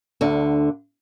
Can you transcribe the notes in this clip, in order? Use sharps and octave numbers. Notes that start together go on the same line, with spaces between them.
D2 D3